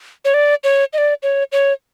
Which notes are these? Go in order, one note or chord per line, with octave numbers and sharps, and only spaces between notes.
C#5
D5
C#5
D#5
D5
C#5
C#5